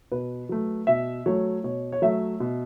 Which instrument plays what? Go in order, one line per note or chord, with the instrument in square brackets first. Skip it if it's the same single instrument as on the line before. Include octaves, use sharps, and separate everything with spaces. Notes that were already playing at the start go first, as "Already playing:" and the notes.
[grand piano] B2 B4
F#3 A3
B2 E5
F#3 A3 C#5
B2 C#5
C#5
F#3 A3 E5
B2